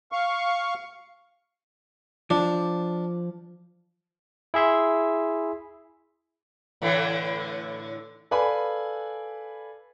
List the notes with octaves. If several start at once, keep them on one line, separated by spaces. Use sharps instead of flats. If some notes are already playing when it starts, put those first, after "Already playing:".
F5 C#6
F3 D4
E4 G#4 E5 C6
A2 D3 E3
A4 B4 D5 F5 G#5 B5